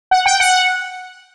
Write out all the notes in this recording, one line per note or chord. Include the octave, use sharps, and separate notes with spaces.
F#5
G5
F#5